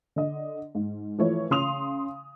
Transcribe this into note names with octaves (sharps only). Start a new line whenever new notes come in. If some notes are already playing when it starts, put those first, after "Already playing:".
D3 D#5
G#2
E3 F3 A3 E4 C#5
C#3 C6 D#6 F7